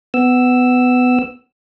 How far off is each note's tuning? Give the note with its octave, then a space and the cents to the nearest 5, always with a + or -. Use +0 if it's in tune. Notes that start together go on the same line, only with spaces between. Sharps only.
B3 +20 E6 +0